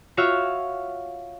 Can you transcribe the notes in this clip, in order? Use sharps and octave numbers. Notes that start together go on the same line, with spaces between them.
F4 F#4 C#5 E5 F5